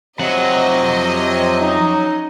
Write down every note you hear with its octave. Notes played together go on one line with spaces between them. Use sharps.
F2 C3 F#3 D#5 F#5
C#4 D#4